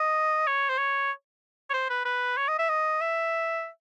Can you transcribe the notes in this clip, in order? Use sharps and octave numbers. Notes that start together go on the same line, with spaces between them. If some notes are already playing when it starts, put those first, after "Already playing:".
Already playing: D#5
C#5
C5
C#5
C#5
C5
B4
B4
C#5
D#5
E5
D#5
E5